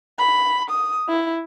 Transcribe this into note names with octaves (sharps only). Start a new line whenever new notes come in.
B5
D#6
E4